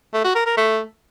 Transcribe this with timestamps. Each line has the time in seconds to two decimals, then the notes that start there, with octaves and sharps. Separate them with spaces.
0.14 A3
0.25 F#4
0.35 A#4
0.46 A#4
0.57 A3